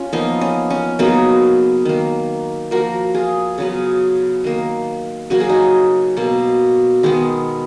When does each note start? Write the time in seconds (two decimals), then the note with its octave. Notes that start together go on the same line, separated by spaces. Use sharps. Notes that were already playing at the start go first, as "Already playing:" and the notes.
Already playing: C#4 F4
0.13 F3 A#3 B3 D#4
0.41 C#4
0.70 C#4
0.99 C#3 F#3 A#3 B3 D#4
1.85 D#3 A#3
2.71 F3 A#3 F#4 A#4
3.15 F4 G#4
3.58 C#3 F#3 B3
4.44 D#3 A#3
5.30 C#3 F#3 A#3 F#4
5.40 G#4
5.49 D#4 F#4
6.17 B2 A#3
7.03 D#3 G#3 B3